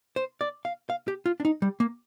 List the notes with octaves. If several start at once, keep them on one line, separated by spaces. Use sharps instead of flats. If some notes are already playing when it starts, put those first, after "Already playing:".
C5
D5
F5
F5
G4
F4
D4
D#4
G3
A#3